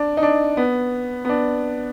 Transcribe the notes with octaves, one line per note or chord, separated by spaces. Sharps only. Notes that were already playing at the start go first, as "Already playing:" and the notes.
Already playing: D4
D#4
D4
B3
B3
D4